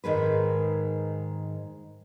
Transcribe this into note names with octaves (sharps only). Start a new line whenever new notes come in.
G#2 D#3 G#3 B4